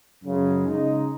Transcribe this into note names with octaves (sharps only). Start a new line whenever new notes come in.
F#2 C#3 G#3
C#3 G#3 D#4